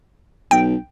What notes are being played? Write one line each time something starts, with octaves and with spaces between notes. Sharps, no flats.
B1 G5